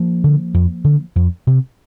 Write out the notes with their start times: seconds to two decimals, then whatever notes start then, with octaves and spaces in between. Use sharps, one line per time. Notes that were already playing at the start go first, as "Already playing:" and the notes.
Already playing: F3 A#3
0.24 D3
0.54 F2
0.84 D3
1.16 F2
1.47 C3